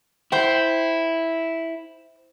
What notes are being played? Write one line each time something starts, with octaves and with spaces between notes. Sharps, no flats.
E4 C5 G5